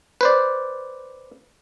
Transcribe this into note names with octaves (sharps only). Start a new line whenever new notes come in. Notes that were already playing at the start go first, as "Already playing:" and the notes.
B4 C5 D5